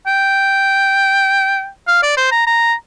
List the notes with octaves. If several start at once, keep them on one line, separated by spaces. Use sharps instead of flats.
G5
F5
D5
C5
A#5
A#5